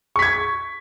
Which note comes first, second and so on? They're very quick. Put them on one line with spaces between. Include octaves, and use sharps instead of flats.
C#6 B6 G#6